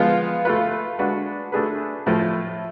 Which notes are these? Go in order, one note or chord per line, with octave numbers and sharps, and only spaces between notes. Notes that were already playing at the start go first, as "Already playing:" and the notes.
Already playing: F3 G#3 B3 F4
A3 F4 B4
G#3 D4 F#4 B4
A3 D4 G#4 B4
A2 F3 A3